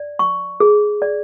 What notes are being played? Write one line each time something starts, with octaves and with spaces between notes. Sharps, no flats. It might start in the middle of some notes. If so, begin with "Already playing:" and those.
Already playing: D5
C#6
G#4
D5